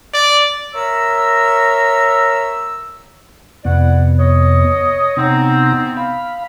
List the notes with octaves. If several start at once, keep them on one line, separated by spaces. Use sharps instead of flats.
D5
A#4 C#5 E5 A#5 E6
F2 C3 B3 E4 D5 F#5
C#5 D#5
C3 B3 C4 D#4 A#5
F5 B5